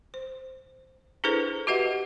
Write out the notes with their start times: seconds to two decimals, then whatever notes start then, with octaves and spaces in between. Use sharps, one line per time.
0.14 C5
1.24 D4 E4 G#4 A4 B4 C5
1.67 F#4 G4 B4 D#5 E5 F#5